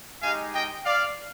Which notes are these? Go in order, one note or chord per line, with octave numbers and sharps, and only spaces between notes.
G#3 D#4 G4 F5 G#5
D#5 G5
D5 F5